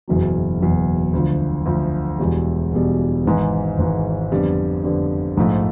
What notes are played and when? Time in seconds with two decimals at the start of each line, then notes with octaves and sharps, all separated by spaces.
0.08 F#1 E2 B2 F#3
0.61 F#1 E2 B2 F#3
1.13 D2 D3 F3
1.66 D2 D3 F3
2.19 E1 E2 B2 G3
2.72 E1 E2 B2 G3
3.25 G#1 G#2 E3
3.78 G#1 G#2 E3
4.31 F2 D3 G3 B3
4.84 F2 D3 G3 B3
5.37 A#1 G#2 F3 A3